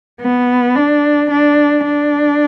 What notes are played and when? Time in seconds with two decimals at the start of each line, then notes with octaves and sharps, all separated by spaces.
0.21 B3
0.75 D4
1.31 D4
1.86 D4